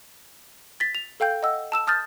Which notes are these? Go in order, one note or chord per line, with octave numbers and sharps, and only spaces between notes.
A6 B6
F7
A4 F5 G5 G6
D#5 F#5 E6
A5 E6 E7
A5 D#6 F6 G6 A6